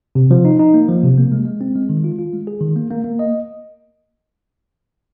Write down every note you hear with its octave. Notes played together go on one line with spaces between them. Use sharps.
C3
F3
D#4
D#4
A#3
F3
C3
A#3
G#3
G#3
C4
G#3
D#3
F4
F4
G#3
G#4
D#3
A#3
A#3
A#3
D#5